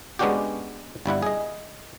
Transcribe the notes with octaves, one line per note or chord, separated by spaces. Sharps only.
G#3 B3 C#4 D4 F#4 G4
G1 G3 E4 F#5
G#4 D#5